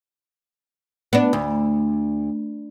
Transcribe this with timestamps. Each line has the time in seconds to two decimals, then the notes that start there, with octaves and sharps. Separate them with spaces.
1.13 B3 D4
1.33 D2